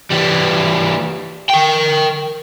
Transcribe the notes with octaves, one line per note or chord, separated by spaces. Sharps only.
E3 G3
A#4 G5